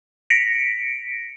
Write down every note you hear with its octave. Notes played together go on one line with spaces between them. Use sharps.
A#6 B6 C#7 D7